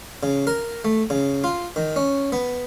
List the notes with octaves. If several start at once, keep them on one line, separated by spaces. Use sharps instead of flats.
C#3
A#4
A3
C#3
F4
D#3
C#4
B3